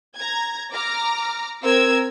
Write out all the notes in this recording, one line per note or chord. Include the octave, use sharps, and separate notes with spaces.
A#5 G#6
A#5 D6 F6
C4 A#4 E6 G#6